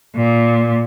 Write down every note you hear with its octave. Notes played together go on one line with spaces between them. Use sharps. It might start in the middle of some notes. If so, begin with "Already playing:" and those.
A#2